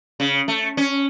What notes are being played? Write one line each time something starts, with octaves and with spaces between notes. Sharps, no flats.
C#3
A3
C#4